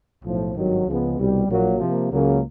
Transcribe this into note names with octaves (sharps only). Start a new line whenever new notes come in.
B1 A2 F3
G#1 G2 D#3 F#3
C#2 C#3 F3 G#3 B3
C2 B2 G3
A#1 A#2 F#3 A#3
C3 F3 A#3
C#2 C#3 F#3 A#3